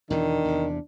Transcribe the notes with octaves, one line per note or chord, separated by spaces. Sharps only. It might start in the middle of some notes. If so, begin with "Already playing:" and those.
E2 B2 D#3 E3 D4
E2 C3